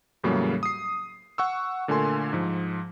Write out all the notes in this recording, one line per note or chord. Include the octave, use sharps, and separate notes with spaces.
E2 A2 C#3 F#3 G3 A#3
D#6 C7
F#5 C#6 E6
A#2 D3 A3 A#4 G#5 C6
G#2 F3